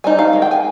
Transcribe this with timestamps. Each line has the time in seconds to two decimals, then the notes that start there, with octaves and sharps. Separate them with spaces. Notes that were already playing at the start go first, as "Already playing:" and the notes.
0.04 G3 C4 D#4 G#5
0.19 F5
0.33 D#3 G#3
0.42 G5
0.51 G#5